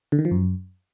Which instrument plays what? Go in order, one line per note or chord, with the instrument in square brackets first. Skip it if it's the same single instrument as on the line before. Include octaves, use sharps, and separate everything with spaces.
[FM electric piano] D3
D#3
F3
F#2